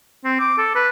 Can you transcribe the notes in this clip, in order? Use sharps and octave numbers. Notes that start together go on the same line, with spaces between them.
C4
D6
A4
B4